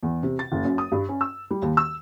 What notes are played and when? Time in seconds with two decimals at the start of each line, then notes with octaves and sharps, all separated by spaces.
0.03 E2
0.23 C3
0.39 A6
0.52 F#1
0.65 F#2
0.78 D#6
0.92 G2
1.09 C#4
1.21 E6
1.51 G3
1.62 D#2
1.77 E6